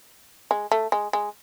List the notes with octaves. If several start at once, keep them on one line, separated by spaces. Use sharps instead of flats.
G#3
A3
G#3
G#3